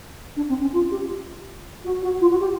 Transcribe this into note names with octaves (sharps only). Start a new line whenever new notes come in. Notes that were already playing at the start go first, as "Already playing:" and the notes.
D4
C4
C#4
F4
G4
F#4
F#4
F4
F#4
G4